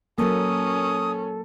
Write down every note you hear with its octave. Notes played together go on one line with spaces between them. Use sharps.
F#3 A#3 C#4 A4 D#6